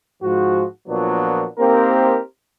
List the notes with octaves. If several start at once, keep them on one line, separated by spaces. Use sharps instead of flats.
G#2 F3 F#4
A#2 F3 F#3 A#3 B3 D4
A#3 C4 D#4 G4 A#4 C5